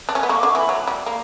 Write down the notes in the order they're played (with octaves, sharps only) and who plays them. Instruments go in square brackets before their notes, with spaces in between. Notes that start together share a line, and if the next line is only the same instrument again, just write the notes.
[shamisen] D4
C#4
B3
[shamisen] A#3 [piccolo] C#6
[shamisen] D3 [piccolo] D6
[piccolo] C#6
[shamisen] E3 [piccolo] B5
[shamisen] F#3
G3
A#3